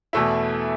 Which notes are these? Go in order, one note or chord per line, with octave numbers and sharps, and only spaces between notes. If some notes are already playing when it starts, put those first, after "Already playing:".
E2 B2 A3 E4